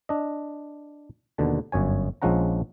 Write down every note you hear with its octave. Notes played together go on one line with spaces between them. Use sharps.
D4 D#5
D#2 B2 D3 A5
G1 F#2 C#5 G#5
A#1 F3 G#3 C#4 F#5 A#5